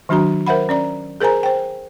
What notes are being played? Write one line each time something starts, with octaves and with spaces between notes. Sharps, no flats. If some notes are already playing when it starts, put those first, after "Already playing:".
D#3 F#3 D4 F#4 A#5
A#4 C5 E5 F#5 B5
C#4 D5 A#5
G#4 A#4 C5 G#5 A#5
C5 G5